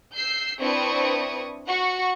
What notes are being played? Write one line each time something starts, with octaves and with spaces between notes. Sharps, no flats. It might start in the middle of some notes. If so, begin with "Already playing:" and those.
E6 G6 C7
C4 D4 E4 B4 C#6 D#6
F#4 F#5 C#6